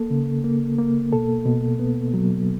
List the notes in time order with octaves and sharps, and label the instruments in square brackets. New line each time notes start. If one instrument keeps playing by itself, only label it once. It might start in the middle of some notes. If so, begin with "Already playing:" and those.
Already playing: [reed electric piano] A#3 A4
C#3
A#3
A#3
B2 A4
B2
B3
F#3